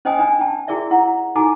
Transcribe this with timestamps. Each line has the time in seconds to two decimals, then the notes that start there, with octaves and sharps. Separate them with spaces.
0.05 C#4 C5 D#5 G5 G#5 D#6
0.19 D4 G#5
0.39 D4 G5 A5
0.68 E4 F#4 G#4 A#4 D5 E5
0.91 E4 F#5 A#5
1.35 D#4 F#4 A4 G#5 A#5 D6